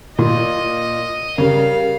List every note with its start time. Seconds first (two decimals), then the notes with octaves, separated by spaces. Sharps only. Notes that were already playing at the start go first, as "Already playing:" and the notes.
0.19 A#2 D#5
1.38 C#3 G3 A#4 F5